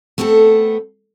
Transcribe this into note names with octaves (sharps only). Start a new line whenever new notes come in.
A3 B3 C4 G#4 A4